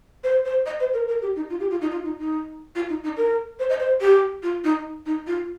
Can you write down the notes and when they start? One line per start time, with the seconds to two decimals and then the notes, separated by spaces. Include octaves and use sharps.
0.24 C5
0.45 C5
0.66 D#5
0.80 C5
0.93 A#4
1.08 A#4
1.22 G4
1.36 D#4
1.50 F4
1.60 G4
1.71 F4
1.81 D#4
1.91 F4
2.05 D#4
2.19 D#4
2.75 F4
2.89 D#4
3.03 D#4
3.17 A#4
3.59 C5
3.70 D#5
3.80 C5
4.01 G4
4.43 F4
4.64 D#4
5.06 D#4
5.27 F4